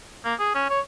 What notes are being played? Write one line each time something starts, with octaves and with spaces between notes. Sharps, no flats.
A#3
G#4
C#4
C#5